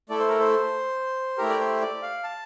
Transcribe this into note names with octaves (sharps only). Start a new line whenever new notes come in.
A3 E4 A4 D5
C5
A#4
C5
A3 E4 G4 A#4
D5
C5
D5
F5
A5